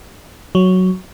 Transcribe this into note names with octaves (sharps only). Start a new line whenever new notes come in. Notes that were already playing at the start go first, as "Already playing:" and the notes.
F#3